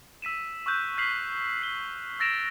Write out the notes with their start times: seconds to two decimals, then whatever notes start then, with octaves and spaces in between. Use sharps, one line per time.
0.22 E6 B6 D#7 E7
0.66 C#6 E6 F#6 G6
0.97 F6 G6 B6 C7 F7 F#7
1.62 C7 G7
2.20 E6 A6 A#6 D7 E7 F7